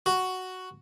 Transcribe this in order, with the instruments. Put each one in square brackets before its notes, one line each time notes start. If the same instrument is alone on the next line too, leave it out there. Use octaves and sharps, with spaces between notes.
[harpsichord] F#4